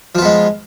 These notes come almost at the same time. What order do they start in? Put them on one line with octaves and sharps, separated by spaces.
F3 F4 B3 G#3